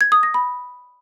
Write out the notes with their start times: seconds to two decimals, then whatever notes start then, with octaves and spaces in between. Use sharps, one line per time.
0.01 G#6
0.12 D#6
0.23 A#6
0.34 B5